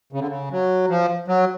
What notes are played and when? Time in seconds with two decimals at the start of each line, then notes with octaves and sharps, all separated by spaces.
0.13 C#3
0.20 D3
0.28 C#3
0.51 F#3
0.89 F3
1.28 F#3